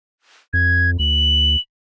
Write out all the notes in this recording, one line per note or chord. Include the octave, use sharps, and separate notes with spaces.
F2 G#6
D2 F#7